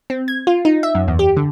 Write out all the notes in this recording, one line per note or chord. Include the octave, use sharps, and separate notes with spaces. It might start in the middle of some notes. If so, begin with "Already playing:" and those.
C4
G#6
F4
D#4
E5
F#2
E2
G4
D3